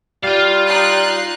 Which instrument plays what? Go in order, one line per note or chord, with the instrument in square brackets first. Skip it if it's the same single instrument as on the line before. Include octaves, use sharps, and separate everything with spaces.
[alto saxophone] G3 [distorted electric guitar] F4 F5
[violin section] D#4 F#6 C7